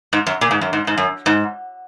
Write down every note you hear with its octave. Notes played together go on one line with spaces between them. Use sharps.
G#2
F#2
A#2
G#2
F#2
G#2
G#2
F#2
G#2